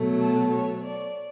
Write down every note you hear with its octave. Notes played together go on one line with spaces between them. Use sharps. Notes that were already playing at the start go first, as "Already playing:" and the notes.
Already playing: B2 F#3 A3
A5
C#5
D5